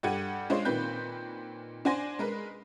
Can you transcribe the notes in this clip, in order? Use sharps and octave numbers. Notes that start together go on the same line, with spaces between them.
G2 G4 A4 F#5 G#6 D#7
G#3 D4 F4 C5 C#5 D#5
A#2 D#3 C4 B4 G6
D4 C5 G#5 C6 A#6
G#3 A#4 B4